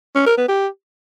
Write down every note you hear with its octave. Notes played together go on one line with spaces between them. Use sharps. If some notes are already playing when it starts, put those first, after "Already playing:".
C#4
A#4
B3
G4